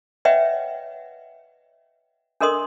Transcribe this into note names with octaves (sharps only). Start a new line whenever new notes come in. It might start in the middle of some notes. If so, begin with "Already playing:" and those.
B4 C#5 D#5 E5 F#5 G5
D4 A4 A#4 D#5 C6 D#6